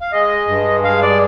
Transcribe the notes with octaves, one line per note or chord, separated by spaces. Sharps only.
F5
G#3 D#5
G2
G#3 F5
D5